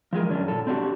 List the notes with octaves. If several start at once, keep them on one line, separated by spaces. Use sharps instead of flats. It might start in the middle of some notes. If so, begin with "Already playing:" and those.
F3 G#3 G#4 A#4
F#2 D3 C#4 D4
A#2 A4
C4 D4 F#4 G4